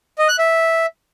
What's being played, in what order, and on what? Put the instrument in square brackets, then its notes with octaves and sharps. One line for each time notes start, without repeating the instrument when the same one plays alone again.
[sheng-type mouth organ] D#5
F#6
E5